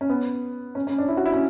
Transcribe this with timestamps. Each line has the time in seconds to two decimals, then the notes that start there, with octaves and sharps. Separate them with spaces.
0.01 C#4
0.10 B3
0.75 C#4
0.87 C#4
0.98 D4
1.08 E4
1.17 F#4
1.26 E4
1.33 C#4